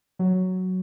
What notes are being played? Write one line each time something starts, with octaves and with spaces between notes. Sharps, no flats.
F#3